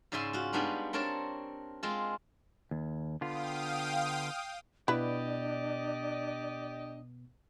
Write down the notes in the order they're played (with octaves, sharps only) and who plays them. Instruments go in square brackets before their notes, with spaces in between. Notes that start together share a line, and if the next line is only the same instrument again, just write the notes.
[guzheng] G#2 C#3 D5 E5 G#5 C6
F4 F#4
G3 G#3 B3 D4 D#4 F5
C4 D4 A#4 C#5 A5
G#3 C4 F4
[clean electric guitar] D#2
[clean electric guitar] D3 B3 F4 [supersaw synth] F5 G5 D#6
[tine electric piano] B2 B3 [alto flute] D4 [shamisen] E4 B4 [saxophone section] G4 D5 D#5